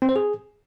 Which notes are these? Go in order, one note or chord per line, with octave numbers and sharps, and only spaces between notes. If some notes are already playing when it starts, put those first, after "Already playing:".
C4
C5
G#4